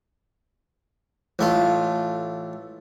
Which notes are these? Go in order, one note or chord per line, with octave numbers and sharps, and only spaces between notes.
A1 A3 F4